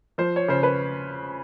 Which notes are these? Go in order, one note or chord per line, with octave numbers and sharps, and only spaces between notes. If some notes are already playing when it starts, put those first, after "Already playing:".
F3 C5
C#5
C#3 C5
B4